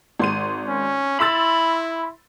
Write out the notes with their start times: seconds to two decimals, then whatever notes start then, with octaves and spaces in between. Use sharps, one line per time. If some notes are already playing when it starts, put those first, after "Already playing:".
0.19 G#1 C6 D#7
0.69 C#4
1.20 E4 B5 C6 E6 A6